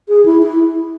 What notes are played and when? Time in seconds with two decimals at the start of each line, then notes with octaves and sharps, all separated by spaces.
0.09 G#4
0.25 E4
0.43 E4